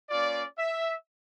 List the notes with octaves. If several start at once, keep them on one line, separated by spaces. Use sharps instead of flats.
A#3 C#4 F4 D5
E5